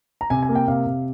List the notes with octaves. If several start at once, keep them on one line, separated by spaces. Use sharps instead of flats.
A#5
C3 G#5
G#5
A#3
G5
C3 F5
C3